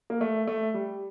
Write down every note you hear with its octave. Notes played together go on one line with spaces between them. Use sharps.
A#3
A3
A3
G3